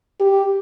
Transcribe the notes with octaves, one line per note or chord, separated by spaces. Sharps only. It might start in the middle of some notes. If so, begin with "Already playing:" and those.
G4